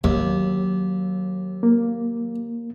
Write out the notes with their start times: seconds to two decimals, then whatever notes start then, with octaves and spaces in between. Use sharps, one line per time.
0.04 D#2 F#3
1.63 A#3